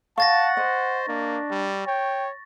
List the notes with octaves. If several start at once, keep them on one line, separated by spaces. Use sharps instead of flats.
F5 F#5 A5 C#6 A6 A#6
C5 D#5
A#3 D4
G3
C#5 G5